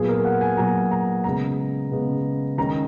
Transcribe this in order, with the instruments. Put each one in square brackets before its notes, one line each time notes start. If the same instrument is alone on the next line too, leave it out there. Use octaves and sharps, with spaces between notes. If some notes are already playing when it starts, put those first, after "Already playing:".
Already playing: [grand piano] A#2 F#3 B3 G#4
A#4
F#5
G#5
A#2 F#3 B3 A#5
A#5
C#3 G#3 B3 A#5
C#3 G#3 B3
D#3 G#3 C#4 A#5